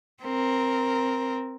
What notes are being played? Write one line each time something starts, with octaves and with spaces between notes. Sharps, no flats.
C4 A#4